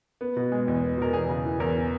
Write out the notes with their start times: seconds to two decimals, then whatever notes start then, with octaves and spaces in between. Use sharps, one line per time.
0.21 B3
0.37 B2
0.52 G#3
0.68 E2
0.83 B3
0.98 B2 A#4
1.13 E2 G#4
1.29 C#3
1.45 E3
1.60 E2 A#4